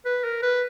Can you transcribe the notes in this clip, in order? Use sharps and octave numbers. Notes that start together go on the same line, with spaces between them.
B4
A#4
B4